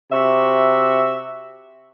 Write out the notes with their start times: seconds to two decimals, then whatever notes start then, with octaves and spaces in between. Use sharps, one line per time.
0.12 C3 F#4 E5